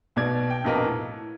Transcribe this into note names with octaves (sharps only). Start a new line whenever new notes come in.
B1 B2 D5 G#6
G5
A#1 F2 B2 A#3 B4 D#5
A2